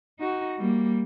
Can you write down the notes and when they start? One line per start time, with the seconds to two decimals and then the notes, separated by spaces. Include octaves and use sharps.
0.20 D#4 F#4
0.58 G3 A#3